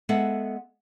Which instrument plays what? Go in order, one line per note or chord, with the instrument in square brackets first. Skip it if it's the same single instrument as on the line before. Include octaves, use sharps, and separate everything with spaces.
[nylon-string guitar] G#3 B3 A4 E5 F#5